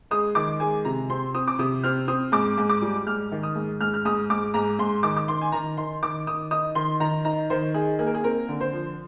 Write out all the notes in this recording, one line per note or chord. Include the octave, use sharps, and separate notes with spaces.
G#3 D#6
D#3 D6
G#3 G#5
C3 A#5
C4 C6
C4 D#6
D6
C3 D#6
C4 F6
C4 D#6
G#2 D6
G#2
D6
G3
G#2 F6
D#3
D#6
G#2
G#2 F6
F6
G#2 D#6
G#2 D6
G#2 A#5
G#2 C6
D#3 D6
D6
D#3 C6
G#5
D#3 A#5
D#3 C6
D#3 D6
D#3 D#6
D#4 D#6
D#3 C6
D#3 A#5
D#4 A#5
D#3 C5
D#4 G#4
A#3 G#4
A#4
G#4
C4 A#4
D3
C5
F3